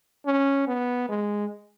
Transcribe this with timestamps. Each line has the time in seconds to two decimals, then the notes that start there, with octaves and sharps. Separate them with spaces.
0.26 C#4
0.68 B3
1.09 G#3